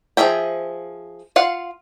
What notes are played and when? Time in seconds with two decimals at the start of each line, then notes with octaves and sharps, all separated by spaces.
0.17 F3 F#3 G#4 E5 G5
1.36 F4 F5 F#5